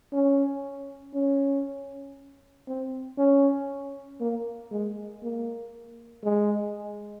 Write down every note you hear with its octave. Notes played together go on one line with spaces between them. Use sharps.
C#4
C#4
C4
C#4
A#3
G#3
A#3
G#3